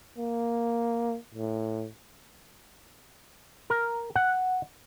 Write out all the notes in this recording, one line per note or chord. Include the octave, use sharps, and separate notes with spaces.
A#3
A2
A#4
F#5